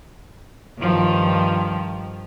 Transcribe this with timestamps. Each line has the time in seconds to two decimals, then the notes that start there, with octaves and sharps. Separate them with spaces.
0.78 G2 D#3 F3